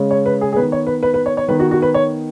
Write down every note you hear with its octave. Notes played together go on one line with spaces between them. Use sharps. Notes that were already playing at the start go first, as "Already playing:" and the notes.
Already playing: C#3 G#3 C#4
C#5
B4
G#4
G#4
D#3 B3 B4
C#5
B4
B4
B4
C#5
C#5
D#3 B3 B4
F#4
F#4
B4
C#5